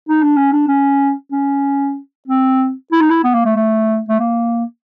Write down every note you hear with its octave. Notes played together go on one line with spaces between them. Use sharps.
D#4
D4
C#4
D4
C#4
C#4
C4
E4
D#4
E4
B3
A#3
A3
A3
A3
A#3